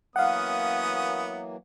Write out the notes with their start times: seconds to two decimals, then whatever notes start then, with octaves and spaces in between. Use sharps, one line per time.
0.16 E3 F#3 A#3 B3 C#4 F5 F#5 D#6